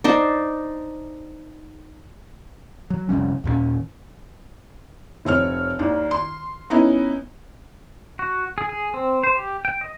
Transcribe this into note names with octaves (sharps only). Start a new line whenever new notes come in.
D4 D#4 C5
F#3
F1 C3 G3 C#4
D#2 A#2 G3 C#4
F1 C4 C#5 F6
D#2 D#3 D4
C6
B3 C#4 D#4 E4
F#4
G#4
G#4
C4
C5
G4
G5
D#5